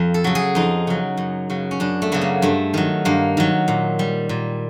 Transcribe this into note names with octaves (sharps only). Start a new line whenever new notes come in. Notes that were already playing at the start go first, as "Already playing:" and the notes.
Already playing: F2
A4
C#3 F#3
G#4
F2 D#4
C#3 F#3
F#2
C#3 F#3
C#4
F#2 D4
A3
C#3 F#3 B3
A#3
G2 A3
D#3 F#3
G2 A#3
D#3 F#3
A#2
G3
A#2